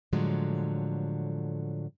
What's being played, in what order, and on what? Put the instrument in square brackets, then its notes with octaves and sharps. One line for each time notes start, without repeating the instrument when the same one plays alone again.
[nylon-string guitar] A2 D3 F3 F#3 G#3